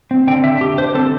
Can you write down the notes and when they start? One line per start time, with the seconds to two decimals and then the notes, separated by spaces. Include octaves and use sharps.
0.11 C4
0.27 D3 G5
0.44 D3 E5
0.61 D3 G4
0.78 D3 C5
0.95 C4 A4